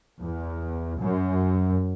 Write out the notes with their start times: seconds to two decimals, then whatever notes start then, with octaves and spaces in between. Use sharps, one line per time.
0.21 E2
1.00 F#2